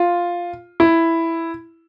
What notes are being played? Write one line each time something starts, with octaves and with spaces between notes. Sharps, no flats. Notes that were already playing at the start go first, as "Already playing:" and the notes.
Already playing: F4
E4